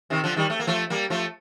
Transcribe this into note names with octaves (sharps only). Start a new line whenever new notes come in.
C3 D#3
D3 F3
D#3 G3
A3
A#3
F3 A3
G3 A#3
F3 A3